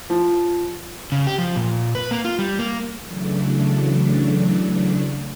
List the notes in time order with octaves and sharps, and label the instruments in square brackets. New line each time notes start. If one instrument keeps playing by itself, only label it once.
[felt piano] F3
[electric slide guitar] C#3
G4
F3
A#2
B4
A#3
F4
G3
A#3
[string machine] C#3 E3 F#3 A3 D4